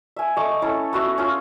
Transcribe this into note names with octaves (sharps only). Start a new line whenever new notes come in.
E5 G#5
A3 D#5 C#6 D6
C#4 E4 A4
B3 F#4 E5
C#4 F4